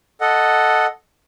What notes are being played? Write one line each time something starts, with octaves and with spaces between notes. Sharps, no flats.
A4 D#5 F#5